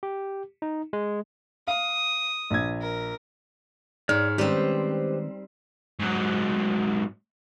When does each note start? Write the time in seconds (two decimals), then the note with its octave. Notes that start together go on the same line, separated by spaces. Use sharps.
0.03 G4
0.62 D#4
0.93 G#3
1.67 F5 D#6
2.50 A#1 G#6
2.81 A#4
4.09 G#2 C#5 D5 F6
4.38 D#3 G3 G#3 C4 C#4 G4 B4 C5
6.00 G#2 F#3